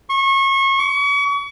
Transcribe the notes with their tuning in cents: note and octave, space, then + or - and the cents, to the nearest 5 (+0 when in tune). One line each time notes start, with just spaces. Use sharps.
C#6 -30
C#6 +40